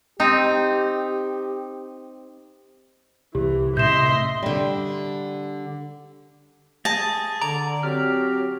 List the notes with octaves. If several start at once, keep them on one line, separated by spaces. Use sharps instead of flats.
C4 D#4 G4
C2 E3 G4
A2 C3 C#4 D#5 E5 C6 G6 E7
D3 G3
G#4 A5 A#6
D3 D5 A#5
F#3 C4 G4 F6